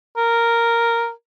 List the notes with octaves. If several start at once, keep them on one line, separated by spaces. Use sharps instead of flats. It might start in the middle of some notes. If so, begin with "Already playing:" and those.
A#4